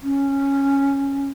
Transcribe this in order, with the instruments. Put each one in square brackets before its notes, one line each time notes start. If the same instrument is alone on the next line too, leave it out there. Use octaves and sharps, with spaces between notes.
[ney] C#4